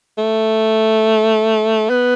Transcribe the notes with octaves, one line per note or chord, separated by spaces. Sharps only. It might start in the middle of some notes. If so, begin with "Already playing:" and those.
A3
B3